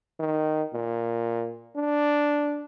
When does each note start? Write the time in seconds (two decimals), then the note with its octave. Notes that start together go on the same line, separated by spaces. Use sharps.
0.20 D#3
0.74 A#2
1.76 D4